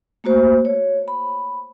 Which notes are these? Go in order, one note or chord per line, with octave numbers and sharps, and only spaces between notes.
A3 A#3 F#4 C5
C#5
B5